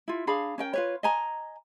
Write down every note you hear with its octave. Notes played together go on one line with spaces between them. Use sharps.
E4 F4
D4 G#4 F5 B5
C#4 A#4 G5
F4 B4 C#5
D#5 G#5 A#5